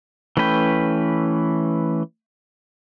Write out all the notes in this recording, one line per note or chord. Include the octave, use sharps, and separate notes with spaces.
E3 A3 C#4 B4 G5